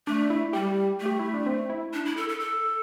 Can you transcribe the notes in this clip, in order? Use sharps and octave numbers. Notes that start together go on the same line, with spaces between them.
A3 D4
E4
G3 G4
A3
G4
E4
D4
C4
E4
D4
E4
A4
A4
A4